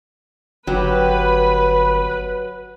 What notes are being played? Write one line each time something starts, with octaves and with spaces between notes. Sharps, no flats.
G1 F#3 G4 B4